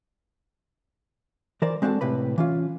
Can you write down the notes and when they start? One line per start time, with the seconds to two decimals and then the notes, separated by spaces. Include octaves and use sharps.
1.62 E3 A#4 C5 D5
1.82 G#3 C4 D4 D#4 F#4 A4
2.01 A2 C3 B4 B5
2.38 E3 C#4 F4